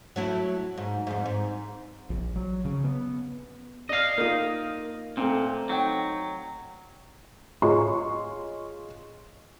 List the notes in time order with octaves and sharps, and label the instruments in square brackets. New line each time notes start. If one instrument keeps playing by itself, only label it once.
[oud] F#3 A3 E4
G#2
F2 G#2
G#2
[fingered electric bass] A#1
F#3
C#3
B3
[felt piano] D5 F6 [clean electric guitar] D#5 F5
[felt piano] A#3 D#6 [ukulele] D#4 F4
[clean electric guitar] A#2 [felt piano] A3 C4
[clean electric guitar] F#3 [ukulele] D#4 G5
[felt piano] F4 G#4 C#5 D#5 C6 C#6